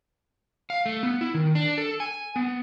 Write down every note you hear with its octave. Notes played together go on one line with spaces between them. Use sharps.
F5
A3
B3
E4
D#3
D4
A4
G#5
B3